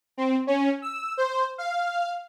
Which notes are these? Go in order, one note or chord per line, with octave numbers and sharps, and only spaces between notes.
C4
C#4
E6
C5
F5